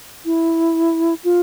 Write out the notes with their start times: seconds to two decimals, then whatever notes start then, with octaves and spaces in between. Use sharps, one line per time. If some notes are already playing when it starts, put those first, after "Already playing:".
0.25 E4
1.24 F4